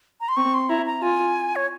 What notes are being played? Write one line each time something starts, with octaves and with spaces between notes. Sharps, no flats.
A#5
C6
C4 C#6
C6
E4 A#5
A#5
F4 G#5
C#5